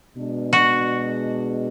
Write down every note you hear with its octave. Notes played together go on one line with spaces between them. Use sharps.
B2 G#3 D4
F#4